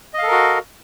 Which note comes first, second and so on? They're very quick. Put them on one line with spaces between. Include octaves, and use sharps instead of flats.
D#5 F5 A4 A#4 F#4